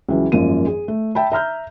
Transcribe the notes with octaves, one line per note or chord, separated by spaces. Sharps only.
C#2 E3 F#3
G#1 F#2 F3 A#3 D#7
G#4
A3
E5 G5 A5 B5
E5 A#5 F6 G6